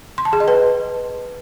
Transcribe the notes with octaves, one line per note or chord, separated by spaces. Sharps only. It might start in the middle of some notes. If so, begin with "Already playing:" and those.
C6
A5
G#4
D#5
B4